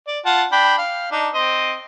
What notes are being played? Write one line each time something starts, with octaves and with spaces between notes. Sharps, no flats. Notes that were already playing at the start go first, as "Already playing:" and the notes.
D5
F4 F#5 A5
D4 G5 B5
F5
D4 D#4
C4 C5 D#5